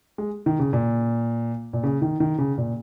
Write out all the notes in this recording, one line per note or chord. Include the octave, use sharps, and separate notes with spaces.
G#3
D#3
C#3
A#2
A#2
C#3
D#3
D#3
C#3
A#2